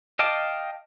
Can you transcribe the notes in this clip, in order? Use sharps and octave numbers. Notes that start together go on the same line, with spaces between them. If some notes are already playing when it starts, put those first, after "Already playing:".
D#5 F5 G5 A5 D6